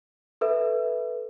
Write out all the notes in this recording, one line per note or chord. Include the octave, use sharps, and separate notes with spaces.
A4 B4 E5